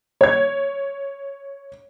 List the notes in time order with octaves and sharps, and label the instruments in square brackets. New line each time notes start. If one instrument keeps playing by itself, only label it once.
[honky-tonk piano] C#5 G#6